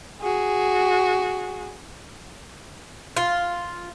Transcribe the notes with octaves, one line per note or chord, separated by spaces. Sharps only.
F#4 G#4
F4